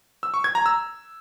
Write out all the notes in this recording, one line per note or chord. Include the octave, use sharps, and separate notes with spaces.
E6
C#6
G#6
A#5
E6